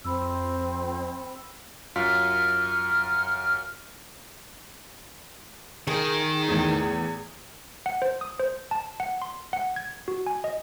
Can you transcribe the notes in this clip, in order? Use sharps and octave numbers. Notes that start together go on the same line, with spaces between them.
F2 C4 B5 E6
F#2 F4 F6 B6
D#3 G#4 A#4
E2 A2 G#6
F#5
C5
D#6
C5
A5
F#5
C6
F#5
G#6
F#4
G#5
D#5